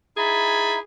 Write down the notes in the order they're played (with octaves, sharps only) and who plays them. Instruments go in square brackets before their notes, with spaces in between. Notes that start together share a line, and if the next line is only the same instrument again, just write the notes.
[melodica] D#4 E4 [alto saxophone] G#4 [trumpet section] G#5 A5 B5